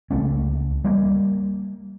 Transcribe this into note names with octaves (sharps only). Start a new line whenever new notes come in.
C#2 A3 C#4
G3 A#3